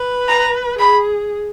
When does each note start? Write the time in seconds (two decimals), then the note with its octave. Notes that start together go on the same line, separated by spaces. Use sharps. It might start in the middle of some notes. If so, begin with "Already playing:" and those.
Already playing: B4
0.28 A#5
0.79 G#4 B5